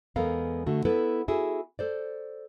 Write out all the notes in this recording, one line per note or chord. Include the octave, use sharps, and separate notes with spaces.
E2 G#3 B3 A4 A#4 F5
D3 A3 F#4
B3 E4 A4 B4
E4 F#4 G#4 A4
A4 C5 D5